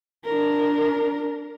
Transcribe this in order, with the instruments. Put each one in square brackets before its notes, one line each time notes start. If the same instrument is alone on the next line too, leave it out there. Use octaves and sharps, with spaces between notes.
[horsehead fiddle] D4 A#4